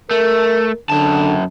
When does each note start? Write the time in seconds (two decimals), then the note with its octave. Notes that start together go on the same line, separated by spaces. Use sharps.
0.11 A3 A#4
0.90 F#2 D3 A5